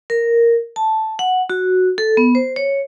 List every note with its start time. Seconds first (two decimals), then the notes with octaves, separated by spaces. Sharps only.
0.10 A#4
0.76 A5
1.19 F#5
1.50 F#4
1.98 A4
2.17 B3
2.35 C5
2.56 C#5